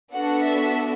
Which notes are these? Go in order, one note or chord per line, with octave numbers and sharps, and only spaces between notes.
B3 D4 F#4 A4 F#5
E5